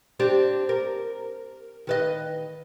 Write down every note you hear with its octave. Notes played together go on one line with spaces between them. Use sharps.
C4 D4 G4
A#4
D#3 B4 D#5